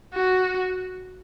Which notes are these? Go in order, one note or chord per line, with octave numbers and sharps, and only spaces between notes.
F#4